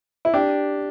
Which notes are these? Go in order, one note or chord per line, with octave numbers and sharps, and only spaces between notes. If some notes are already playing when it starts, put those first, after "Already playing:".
E4
D4 G4